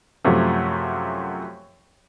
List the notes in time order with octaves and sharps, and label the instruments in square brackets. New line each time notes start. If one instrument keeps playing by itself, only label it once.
[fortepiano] F#2 C3 F3 A3